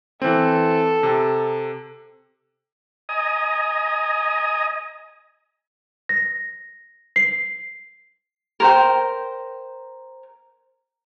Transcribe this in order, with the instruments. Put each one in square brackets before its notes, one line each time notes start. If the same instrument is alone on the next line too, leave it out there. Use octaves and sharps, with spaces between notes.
[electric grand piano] E3 C4 [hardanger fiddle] A4
[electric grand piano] C3
[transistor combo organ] D#5 G#5 A#5 D#6
[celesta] A#6
C7
[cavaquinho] A#4 C5 G5